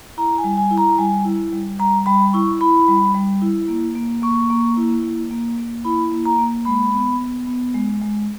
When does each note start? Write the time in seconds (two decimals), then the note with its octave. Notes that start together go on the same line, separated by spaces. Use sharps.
0.17 E4 A#5
0.38 G#5
0.44 G3
0.57 G#5
0.71 E4
0.78 A#5
0.98 G3 G#5
1.25 E4
1.53 G3
1.79 G3 A#5
2.06 G3 B5
2.33 E4 C#6
2.61 E4 B5
2.88 G3
3.15 G3
3.42 E4
3.68 A#3
3.96 A#3
4.22 A#3 C#6
4.50 A#3
4.77 E4
5.04 A#3
5.31 A#3
5.58 A#3
5.85 E4 B5
6.11 A#3
6.25 A#5
6.38 A#3
6.65 G#3 B5
6.93 B3
7.20 B3
7.47 B3
7.75 G#3
8.02 G#3